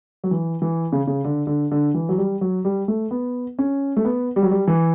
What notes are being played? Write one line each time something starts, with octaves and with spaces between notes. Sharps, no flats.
F#3
E3
E3
C#3
C#3
D3
D3
D3
E3
F#3
G3
F#3
G3
A3
B3
C#4
A3
B3
G3
F#3
G3
E3